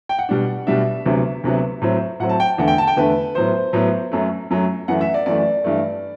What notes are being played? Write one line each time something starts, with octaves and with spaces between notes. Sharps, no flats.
G5
F#5
B2 G3 D4
B2 G3 D4 E5
D2 C3 F#3 B3
D2 C3 F#3 B3
A2 F#3 C4
A2 F#3 C4 F#5
A5
G5
E2 D3 A3 F#5
G5
A5
G5
E2 D3 A3 B4
A2 F#3 B3 C5
A2 F#3 B3
F#2 F#3 A3
F#2 F#3 A3
F#2 E3 A3 F#5
E5
D5
F#2 E3 A3 D5
G2 E3 A3